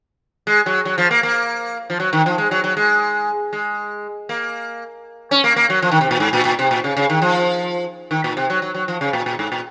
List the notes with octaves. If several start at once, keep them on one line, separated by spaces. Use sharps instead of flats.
G#3
F#3
F#3
F3
A#3
A#3
F3
F#3
D#3
F3
G#3
F#3
F#3
G#3
G#3
A#3
C#4
A#3
A#3
F#3
F3
D#3
C3
A#2
G#2
A#2
A#2
C3
A#2
C#3
C#3
D#3
F3
D#3
A#2
C3
F#3
F#3
F#3
F3
C#3
A#2
A#2
G#2
A#2